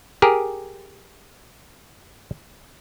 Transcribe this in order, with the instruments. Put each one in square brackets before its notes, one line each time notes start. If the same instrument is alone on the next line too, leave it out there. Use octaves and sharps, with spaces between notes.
[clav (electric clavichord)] G4 G#4 A#4